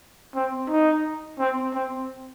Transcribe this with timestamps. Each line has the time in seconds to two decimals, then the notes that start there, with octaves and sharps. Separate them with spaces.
0.35 C4
0.70 D#4
1.39 C4
1.74 C4